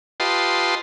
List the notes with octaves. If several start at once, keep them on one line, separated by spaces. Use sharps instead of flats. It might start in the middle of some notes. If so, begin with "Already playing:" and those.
F4 G4 B4 D#5 A5 C6